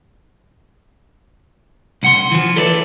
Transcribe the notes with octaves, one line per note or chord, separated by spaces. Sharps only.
C2 F#5 C6
E3 F3
A4 B4 C#5 D5 E5